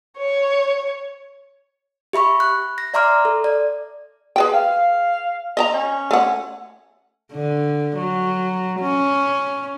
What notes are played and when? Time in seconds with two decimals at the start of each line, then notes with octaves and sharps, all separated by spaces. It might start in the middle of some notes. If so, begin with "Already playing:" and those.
0.18 C#5
2.13 G4 E5 B5 C#6
2.40 F#6
2.78 A#6
2.94 D5 E5 A#5 C6 D6 F6
3.25 A4
3.44 D5
4.36 G#4 B4 G5
4.53 F5
5.57 D#5 E5 A#5
5.74 C#4
6.11 A3 F#5
7.33 D3
7.97 F#3
8.80 C#4